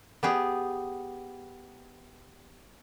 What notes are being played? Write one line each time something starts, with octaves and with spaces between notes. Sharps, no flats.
B3 G4 G#4